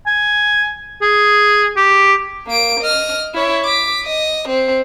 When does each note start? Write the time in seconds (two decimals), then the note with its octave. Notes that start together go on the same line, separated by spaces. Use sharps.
0.07 G#5
1.02 G#4
1.76 G4
2.47 A#3 D7
2.80 D#5 F6
3.34 E4 C#5
3.64 D6 B6
4.04 D#5
4.48 C4